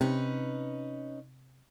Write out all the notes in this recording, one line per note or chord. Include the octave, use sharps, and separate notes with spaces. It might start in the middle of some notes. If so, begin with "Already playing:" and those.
C3 C#4 D#4 B4